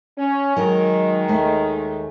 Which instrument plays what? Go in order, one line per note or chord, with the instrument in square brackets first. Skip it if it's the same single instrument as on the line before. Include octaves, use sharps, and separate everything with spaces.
[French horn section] C#4
[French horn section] D#3 G#3 [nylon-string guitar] F#3 A#4
[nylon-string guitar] D#2 A3